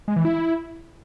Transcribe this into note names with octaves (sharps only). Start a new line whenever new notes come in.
G#3
E3
E4